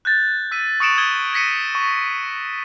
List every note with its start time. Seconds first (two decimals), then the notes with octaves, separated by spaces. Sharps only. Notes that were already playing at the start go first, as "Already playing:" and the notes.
0.05 F#6 G6 A6
0.51 E6 B6 D#7
0.80 C#6 D#6 C#7 D7 E7 F#7
0.98 D#6 G#6 F#7 G7
1.33 G#6 A#6 B6 C#7 D#7
1.75 C#6